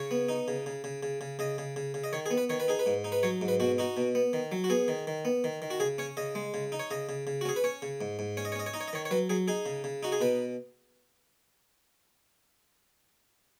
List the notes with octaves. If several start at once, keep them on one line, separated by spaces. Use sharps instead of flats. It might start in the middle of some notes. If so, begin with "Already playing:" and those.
Already playing: C#3 C#5
B3
D#4
C#3
C#3
C#3
C#3
C#3
C#3 D#5
C#3
C#3
C#3
D#5
D#3 C#5
G#4
B3
B4
D#3 C#5
B4
D#4 G#4
B4
G#2
D#4
B4
F#3 C#5
G#2
B4
B2 F#4
D#4 F#4
B2
B3
D#3
F#3
F#4
B3 G#4
D#3
D#3
B3
D#3
D#3
F#4
C#3 G#4
C#4 C#5
C#3 D#5
G#3
C#3
D#4
C#5
C#3 D#5
C#3
C#3
F#4
C#4 G#4
B4
C#4 C#5
C#3
G#2
G#2
C#4 C#5
D#5
C#5
C#4 D#5
C#5
D#4 D#5
C#5
D#5
D#3 C#5
C#5
F#3 B4
F#3 G#4
D#4 G#4
C#3
C#3
D#4 F#4
G#4
B2 B4